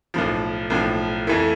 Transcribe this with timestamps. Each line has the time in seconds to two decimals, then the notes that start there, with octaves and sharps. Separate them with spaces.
0.14 B1 A2 F3
0.70 B1 A2 F3
1.27 F2 E3 A3 E4